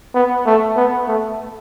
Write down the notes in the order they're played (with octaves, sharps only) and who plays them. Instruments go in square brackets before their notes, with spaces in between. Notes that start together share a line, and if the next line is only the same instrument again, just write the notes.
[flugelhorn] B3
A3
B3
A3